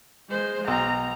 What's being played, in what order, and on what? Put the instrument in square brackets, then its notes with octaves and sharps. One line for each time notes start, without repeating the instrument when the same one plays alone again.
[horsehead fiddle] G#3 C5
[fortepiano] B1 [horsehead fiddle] A#5